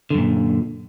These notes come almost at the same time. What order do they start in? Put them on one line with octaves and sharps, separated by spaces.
D3 F#2 A#2